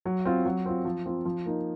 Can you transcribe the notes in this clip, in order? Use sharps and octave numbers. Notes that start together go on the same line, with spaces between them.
F#3
C4 F4
F#3
C4 F4
F3
C4 F4
F3
A#3 D#4